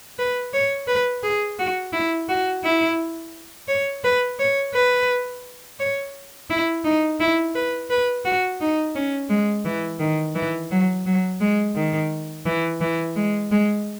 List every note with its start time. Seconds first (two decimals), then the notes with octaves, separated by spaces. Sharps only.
0.19 B4
0.54 C#5
0.88 B4
1.23 G#4
1.59 F#4
1.93 E4
2.29 F#4
2.64 E4
3.68 C#5
4.04 B4
4.39 C#5
4.75 B4
5.79 C#5
6.50 E4
6.84 D#4
7.20 E4
7.55 B4
7.90 B4
8.25 F#4
8.61 D#4
8.95 C#4
9.30 G#3
9.65 E3
10.00 D#3
10.35 E3
10.71 F#3
11.06 F#3
11.41 G#3
11.76 D#3
12.46 E3
12.81 E3
13.16 G#3
13.51 G#3